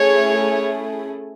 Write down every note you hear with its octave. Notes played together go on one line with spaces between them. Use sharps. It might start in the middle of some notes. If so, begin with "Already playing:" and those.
Already playing: A3 C#4 E4 G#4 C#5